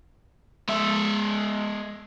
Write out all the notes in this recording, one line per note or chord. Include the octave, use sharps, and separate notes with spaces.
G#3 E5